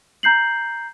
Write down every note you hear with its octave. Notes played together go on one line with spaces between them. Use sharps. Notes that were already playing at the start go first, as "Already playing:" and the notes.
A#5 G6 C7 F#7